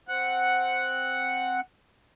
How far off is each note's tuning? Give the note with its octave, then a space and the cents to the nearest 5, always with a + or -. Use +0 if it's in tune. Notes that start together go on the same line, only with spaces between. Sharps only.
C4 +0 F#5 +0